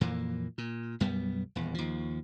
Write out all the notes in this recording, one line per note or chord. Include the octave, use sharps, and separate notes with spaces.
F2 A#2 E3 A#3
A#2
B1 F#2 G3 B3
D#1 E2
D#2 F3